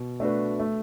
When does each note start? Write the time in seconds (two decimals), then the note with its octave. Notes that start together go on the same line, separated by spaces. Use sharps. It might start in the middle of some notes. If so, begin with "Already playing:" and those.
Already playing: B2
0.20 A3 D4 F#4 B4
0.60 A3